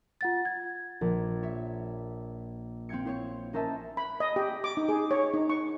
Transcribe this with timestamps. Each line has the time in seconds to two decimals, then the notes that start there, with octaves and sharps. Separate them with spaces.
0.21 F4 F#5 A6
0.45 G#6
1.01 A#1
1.43 C#5 E5
2.89 C4 F5 G5 G#6 C#7
3.05 E4 C5 C#5
3.53 C#4 A#4 C5 D#5 E5 A5
3.97 B5
4.20 D#5
4.36 G4
4.64 D6
4.77 D#4
4.89 G#4
5.11 C#5
5.34 D#4
5.50 C#6